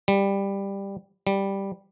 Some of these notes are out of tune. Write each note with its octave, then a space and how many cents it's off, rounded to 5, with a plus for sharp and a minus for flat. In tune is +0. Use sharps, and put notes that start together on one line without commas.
G3 +10
G3 +0